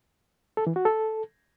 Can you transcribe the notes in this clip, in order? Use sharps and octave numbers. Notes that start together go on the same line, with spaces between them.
A4
E3
F#4
A4